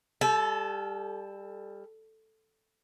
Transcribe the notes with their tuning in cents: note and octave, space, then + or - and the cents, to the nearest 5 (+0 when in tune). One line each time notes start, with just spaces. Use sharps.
G3 +20 A4 +0 A5 -45